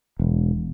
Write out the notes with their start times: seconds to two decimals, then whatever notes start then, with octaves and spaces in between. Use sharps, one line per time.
0.19 E1